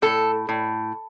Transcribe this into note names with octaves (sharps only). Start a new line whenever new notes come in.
A2 A4
A2